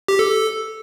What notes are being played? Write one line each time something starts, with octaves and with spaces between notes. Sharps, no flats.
G4
A4